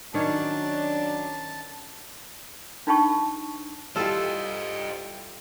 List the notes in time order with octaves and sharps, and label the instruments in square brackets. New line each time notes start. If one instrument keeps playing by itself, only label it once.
[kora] D#3 C#4 C#5 [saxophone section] F#3 D4 [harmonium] A5
[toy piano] D4 D#4 F4 G5 A5 C#6
[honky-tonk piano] G3 E4 G4 [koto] F4 A4 [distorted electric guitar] C5 D#5